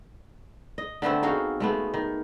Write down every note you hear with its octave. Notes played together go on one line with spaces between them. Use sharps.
D#5
D3 A3 B3 C4
D#4 F#4 G#4 F5
G#3 A3 B3
D#3